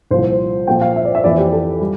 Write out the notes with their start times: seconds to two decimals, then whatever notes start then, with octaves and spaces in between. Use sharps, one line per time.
0.11 C2 A#2 F3 C5
0.67 A#2 F3 A#3 G5
0.81 F5
0.96 E5
1.05 D5
1.15 E5
1.24 F2 E3 A#3 D5
1.38 G4
1.53 A4
1.81 G3